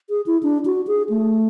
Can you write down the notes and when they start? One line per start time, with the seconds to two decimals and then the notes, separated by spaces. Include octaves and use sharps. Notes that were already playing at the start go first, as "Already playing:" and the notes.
0.10 G#4
0.26 E4
0.43 D4
0.65 F#4
0.87 G#4
1.09 A3